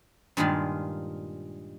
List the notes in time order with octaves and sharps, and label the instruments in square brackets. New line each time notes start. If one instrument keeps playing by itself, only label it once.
[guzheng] G2 A#2 D#3 G#3 F4